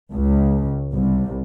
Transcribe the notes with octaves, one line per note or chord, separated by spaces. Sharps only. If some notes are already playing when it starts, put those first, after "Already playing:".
C#2
C2